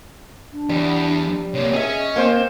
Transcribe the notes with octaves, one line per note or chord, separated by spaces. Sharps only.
D4
E2 G3
C3 A#3 C#5
C#4 G#4 D#5 E5
A#3 C4 C5